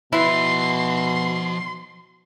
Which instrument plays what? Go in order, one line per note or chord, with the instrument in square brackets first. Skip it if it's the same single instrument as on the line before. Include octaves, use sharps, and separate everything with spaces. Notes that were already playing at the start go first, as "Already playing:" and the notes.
[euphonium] B2 [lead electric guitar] F3 E5 [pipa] E4 B4 [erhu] C6